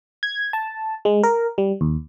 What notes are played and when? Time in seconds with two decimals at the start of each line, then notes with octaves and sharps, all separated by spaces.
0.23 G#6
0.53 A5
1.05 G#3
1.23 A#4
1.58 G3
1.81 D#2